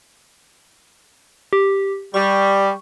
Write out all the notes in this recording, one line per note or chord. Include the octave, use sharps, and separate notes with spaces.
G4
G3 C#6